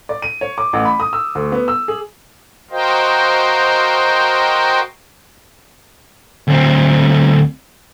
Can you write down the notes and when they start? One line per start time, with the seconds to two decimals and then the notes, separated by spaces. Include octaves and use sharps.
0.09 D5
0.22 D#7
0.41 C#5
0.58 D6
0.73 A1
0.85 B5
1.00 D#6
1.13 E6
1.35 D2
1.52 B3
1.68 E6
1.88 G#4
2.71 F#4 A#4 C5 D#5 F5 G5
6.48 D2 C4